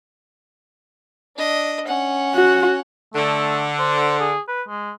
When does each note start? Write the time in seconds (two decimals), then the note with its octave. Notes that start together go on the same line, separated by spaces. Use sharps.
1.37 D4 D#5
1.86 C#4 F#5
2.35 F#4
3.14 D3 A3
3.79 C5
4.20 G#4
4.48 B4
4.68 G#3